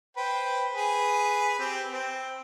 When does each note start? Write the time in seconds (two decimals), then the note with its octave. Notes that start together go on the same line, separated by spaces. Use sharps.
0.17 B4 C5 G5
0.73 G#4 B4
1.59 C4 G4
1.90 C4